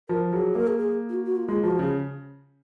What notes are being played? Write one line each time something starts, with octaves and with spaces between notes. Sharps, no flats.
F3 A#4
F#3 G#4
A#3 A#4
G#4
G#4
F4
F#4
F#4
F4
G#3 F4
F3 F#4
C#3 G#4